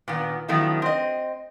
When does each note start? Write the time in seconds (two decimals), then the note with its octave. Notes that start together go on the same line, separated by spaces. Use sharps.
0.08 A#2 D#3 B3
0.48 D#3 F3 F#3 A3 B3 E4
0.82 C4 D#5